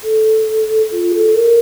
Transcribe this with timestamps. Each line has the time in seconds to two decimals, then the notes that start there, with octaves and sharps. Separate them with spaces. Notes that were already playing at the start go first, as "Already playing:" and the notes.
0.04 A4
0.91 F4
1.12 A4
1.34 A#4